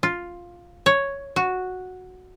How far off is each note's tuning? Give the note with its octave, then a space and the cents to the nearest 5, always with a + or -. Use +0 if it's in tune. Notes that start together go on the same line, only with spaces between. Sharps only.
F4 +5
C#5 +0
F#4 -5